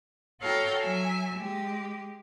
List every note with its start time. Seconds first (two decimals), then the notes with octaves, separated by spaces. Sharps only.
0.41 F#4 A4 C#5 F5 G5 A#5
0.81 F#3 E5 G#5
1.37 G#3 G4